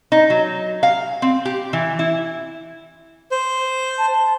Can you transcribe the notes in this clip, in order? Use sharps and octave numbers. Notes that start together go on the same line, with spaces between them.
D#4
F#3
F5
C4
G4
E3
E4
C5
A5